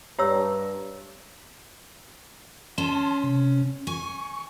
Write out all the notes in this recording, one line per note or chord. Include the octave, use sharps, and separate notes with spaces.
G2 G4 C#5 A#5 E6
C#4 A5 C6
C3
G#5 C#6